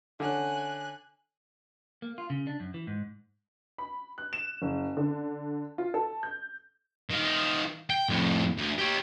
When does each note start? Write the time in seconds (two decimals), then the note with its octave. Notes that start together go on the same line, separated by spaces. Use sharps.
0.20 D3 C#4 G#5 F#6
2.02 A#3
2.18 F4
2.30 C#3
2.47 D4
2.60 F#2
2.74 E3
2.87 G#2
3.78 B5
4.18 F#6
4.33 E7
4.62 F#1
4.97 D3
5.78 F4
5.94 A4
6.23 G6
7.11 D#3 F4
7.90 G5
8.09 F2 A2
8.58 D2
8.79 G4 C#5